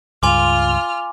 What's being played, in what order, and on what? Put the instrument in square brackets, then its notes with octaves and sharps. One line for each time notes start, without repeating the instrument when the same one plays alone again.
[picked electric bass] C#2 G2 [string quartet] F4 F6 [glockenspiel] G#5 C6 D6